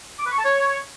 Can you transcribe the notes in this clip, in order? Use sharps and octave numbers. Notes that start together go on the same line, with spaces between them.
D6
B4
C#6
A5
C#5